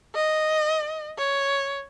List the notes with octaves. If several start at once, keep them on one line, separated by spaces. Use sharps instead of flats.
D#5
C#5